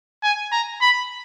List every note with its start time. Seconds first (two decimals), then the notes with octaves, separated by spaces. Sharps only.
0.23 G#5
0.52 A#5
0.82 B5